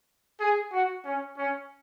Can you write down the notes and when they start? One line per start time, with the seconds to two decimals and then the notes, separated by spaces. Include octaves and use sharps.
0.40 G#4
0.73 F#4
1.05 C#4
1.37 C#4